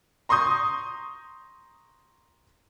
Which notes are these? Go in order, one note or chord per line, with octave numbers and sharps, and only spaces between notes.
A#5 C6 C#6 D#6 G6